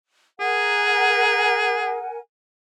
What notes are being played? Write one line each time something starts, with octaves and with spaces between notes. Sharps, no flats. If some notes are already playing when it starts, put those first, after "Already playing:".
G#4 A#4 F#5 G#5